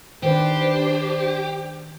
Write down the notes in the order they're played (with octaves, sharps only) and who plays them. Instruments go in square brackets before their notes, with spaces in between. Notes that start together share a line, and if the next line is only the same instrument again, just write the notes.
[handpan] D#3 B4 [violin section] D4 C5 [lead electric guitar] G4